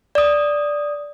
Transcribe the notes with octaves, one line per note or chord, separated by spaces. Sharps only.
D5 D#6